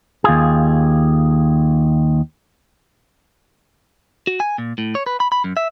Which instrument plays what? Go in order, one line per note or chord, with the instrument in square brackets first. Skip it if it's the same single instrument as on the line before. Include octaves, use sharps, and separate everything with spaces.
[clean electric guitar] D#2 F4 G#4
F#4
G#5
A#2
A2
C#5
B4
B5
B5
F#2
E5